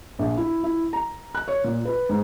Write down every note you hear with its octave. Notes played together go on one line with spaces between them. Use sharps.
A#1
E4
E4
A#5
F#6
C#5
A#2
B4
G#2